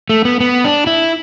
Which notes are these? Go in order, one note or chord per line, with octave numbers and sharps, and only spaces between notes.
A3
B3
B3
D4
E4